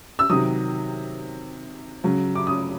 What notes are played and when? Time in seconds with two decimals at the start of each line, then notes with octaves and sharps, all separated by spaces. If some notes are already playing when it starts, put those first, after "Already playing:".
0.19 E6
0.30 C3 D#3 F#3 D#6
2.04 C#3 F#3
2.35 D6
2.47 D#6